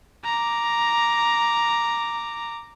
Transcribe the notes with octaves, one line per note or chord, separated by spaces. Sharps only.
A#5 D6